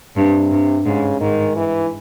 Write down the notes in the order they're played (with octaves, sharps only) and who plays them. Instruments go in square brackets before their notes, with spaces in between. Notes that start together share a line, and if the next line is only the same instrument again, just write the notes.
[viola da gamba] G2 [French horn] C3
[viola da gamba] G2
[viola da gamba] G#2 [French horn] C#3
[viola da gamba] G#2 [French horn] D#3
[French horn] E3